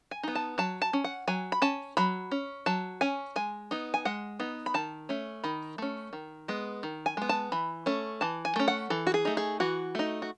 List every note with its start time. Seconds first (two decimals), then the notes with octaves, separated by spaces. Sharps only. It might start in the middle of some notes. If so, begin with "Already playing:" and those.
0.11 G#5
0.23 B3 D#4
0.35 A5
0.58 F#3 A5
0.82 A5
0.93 C#4
1.04 F#5
1.27 F#3 G#5
1.52 B5
1.62 C#4 A5
1.97 F#3 B5
2.31 C#4
2.66 F#3 A5
3.01 C#4 G#5
3.36 G#3 G#5
3.71 B3 D#4
3.94 G#5
4.05 G#3 F#5
4.39 B3 D#4
4.66 B5
4.74 D#3 A5
5.09 A3 C#4
5.44 D#3 B5
5.78 A3 C#4
6.13 D#3
6.48 G#3 B3
6.83 D#3
7.06 G#5
7.17 G#3 B3
7.29 A5
7.52 E3 B5
7.86 A3 C#4
8.21 E3 A5
8.45 G#5
8.56 A3 C#4
8.68 F#5
8.90 E3 A4
9.07 F#4
9.14 G#4
9.25 A3 D#4
9.37 G#4
9.60 E3 F#4
9.95 A3 D#4
10.22 F#4